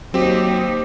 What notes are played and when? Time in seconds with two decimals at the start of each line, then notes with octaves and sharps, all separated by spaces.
0.14 D#2 F#3 C4 D#4 G4